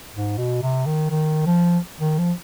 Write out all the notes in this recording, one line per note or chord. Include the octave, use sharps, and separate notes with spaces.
G#2
B2
C3
D#3
D#3
F3
D#3
F3